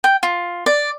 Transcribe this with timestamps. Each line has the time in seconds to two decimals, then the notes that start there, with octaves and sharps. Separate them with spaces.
0.04 G5
0.23 F4
0.66 D5